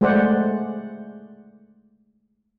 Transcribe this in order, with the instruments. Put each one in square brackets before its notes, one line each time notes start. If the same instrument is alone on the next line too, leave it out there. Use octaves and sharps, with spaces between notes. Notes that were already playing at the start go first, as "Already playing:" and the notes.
[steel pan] G#3 A3 G#4 C5 D5 F#5